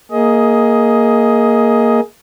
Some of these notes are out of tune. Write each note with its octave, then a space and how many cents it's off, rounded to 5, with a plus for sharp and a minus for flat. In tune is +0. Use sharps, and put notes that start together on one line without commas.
A#3 -5 G#4 +5 D#5 +15